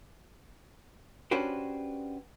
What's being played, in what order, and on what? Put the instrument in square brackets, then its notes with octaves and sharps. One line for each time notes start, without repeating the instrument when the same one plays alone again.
[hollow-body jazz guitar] C#4 D4 F#4 G4 B4 C5